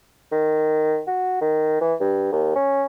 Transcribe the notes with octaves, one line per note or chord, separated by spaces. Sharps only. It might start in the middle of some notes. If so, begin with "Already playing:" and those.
D#3
F#4
D#3
E3
G2
D#2
C#4